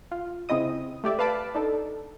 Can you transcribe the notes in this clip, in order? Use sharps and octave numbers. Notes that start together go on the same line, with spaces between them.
F4
C#3 C4 E4 D#5 D#6
A3 G4 D5 E5
B4 F5 A5 B5 D6
D4 D#4 A4